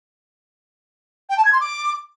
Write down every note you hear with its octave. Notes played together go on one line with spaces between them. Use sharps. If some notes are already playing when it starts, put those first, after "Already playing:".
G5
A5
G#6
C6
D6